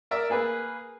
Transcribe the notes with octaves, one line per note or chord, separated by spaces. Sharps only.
A#4 D5 E5
A#3 G#4 B4